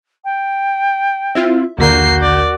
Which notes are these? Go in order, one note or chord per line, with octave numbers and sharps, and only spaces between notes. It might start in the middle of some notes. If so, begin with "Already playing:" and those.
G5
C4 E4 F4 E5
A#1 D#2 D3 A#3 F#4 A#4 G6 C7
D5